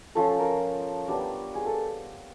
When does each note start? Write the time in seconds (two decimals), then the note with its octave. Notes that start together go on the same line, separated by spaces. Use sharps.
0.15 F3 A3 C#4 F4 A4
0.39 A#4
1.08 G3 B3 D4
1.55 G#4
1.66 A4